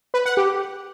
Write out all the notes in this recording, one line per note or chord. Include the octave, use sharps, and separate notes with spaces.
B4
F#5
G4